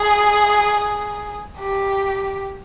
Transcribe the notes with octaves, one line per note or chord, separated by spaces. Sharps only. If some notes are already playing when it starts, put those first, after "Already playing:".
Already playing: G#4
G4